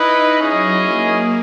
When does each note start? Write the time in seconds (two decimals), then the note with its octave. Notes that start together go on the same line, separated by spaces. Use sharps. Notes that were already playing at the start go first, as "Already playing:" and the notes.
Already playing: D#4 E4 B4 D#5
0.40 F#3 C#4 E4 G#4 D#5
0.80 A#3